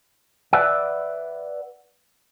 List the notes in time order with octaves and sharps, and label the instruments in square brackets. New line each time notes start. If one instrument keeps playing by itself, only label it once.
[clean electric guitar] B4 D5 E5 F#5